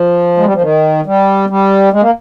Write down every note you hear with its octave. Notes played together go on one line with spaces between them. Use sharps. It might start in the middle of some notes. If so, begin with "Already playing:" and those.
Already playing: F3
G#3
G3
F3
D#3
G3
G3
G#3
A#3